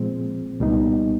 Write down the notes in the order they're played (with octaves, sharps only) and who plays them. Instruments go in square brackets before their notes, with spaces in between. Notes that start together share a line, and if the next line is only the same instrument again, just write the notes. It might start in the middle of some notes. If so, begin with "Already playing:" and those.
Already playing: [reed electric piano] A#2 F3 G#3 C4
C2 A#2 G3 B3 D#4